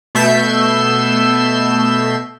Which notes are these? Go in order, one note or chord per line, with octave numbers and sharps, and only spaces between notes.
B2 A3 E5 G6 C7 E7